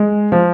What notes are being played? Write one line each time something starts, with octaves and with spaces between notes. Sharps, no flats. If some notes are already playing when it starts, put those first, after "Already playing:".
Already playing: G#3
F3